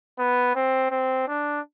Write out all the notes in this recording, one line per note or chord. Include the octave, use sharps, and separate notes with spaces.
B3
C4
C4
D4